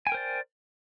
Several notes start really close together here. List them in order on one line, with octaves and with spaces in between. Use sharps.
G#5 G5 A#4 C5 D5